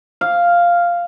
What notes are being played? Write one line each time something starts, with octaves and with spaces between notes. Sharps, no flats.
F5